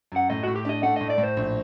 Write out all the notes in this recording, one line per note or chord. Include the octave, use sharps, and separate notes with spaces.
F#2 F#5
A2 D#5
A2 F#4
G4
D4 D#5
A3 F#5
A2 D#5
D5
A2
C5
A#1